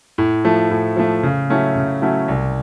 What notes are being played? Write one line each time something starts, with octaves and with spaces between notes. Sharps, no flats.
A2
F3 A3
A2
F3 A3
C#3
F#3 A3 C#4 E4
C#3
F#3 A3 C#4 E4
C2